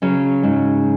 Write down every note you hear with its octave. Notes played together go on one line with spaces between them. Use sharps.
C#3 F#3 C#4
G#2